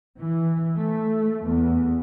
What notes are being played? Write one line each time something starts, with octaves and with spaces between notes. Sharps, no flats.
E3
A3
E2